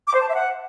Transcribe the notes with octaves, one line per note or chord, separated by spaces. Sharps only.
D6
C5
A5
E5
F#5